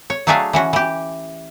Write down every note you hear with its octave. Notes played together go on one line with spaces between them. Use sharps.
C#5
F#3 A3 D4 G#4 E5 F5
E3 C#4 F#4
E3 G4